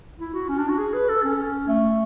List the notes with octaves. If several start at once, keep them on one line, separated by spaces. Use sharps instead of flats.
E4
F#4
C#4
D4
F#4
G#4
B4
A4
C#4
A3